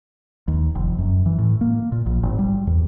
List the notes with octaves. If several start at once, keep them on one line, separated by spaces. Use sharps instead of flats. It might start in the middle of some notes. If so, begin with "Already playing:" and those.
D#2
F1
F#2
E3
A2
A#3
A#2
A#1
G#1
G3
E2